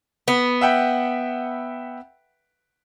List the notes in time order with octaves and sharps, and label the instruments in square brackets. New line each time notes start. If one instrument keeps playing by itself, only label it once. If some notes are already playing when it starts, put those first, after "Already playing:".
[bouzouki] B3
[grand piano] E5 F#5 G5